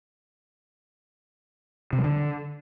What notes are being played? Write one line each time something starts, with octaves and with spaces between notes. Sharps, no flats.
C3
F#3
D3